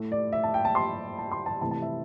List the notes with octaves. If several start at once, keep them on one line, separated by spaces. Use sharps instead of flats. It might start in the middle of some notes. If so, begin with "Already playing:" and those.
Already playing: A2 A3
D5
E5
A5
G5
A5
C6
A5
C6
A5
C3 E3 A3 A5
A5
E5